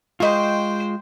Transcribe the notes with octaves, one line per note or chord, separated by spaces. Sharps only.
G#3 F4 C5 D#5 G5 C#6